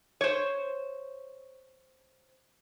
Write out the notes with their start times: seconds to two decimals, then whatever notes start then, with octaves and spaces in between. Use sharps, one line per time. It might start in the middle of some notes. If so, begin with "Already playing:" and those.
0.21 C5 C#5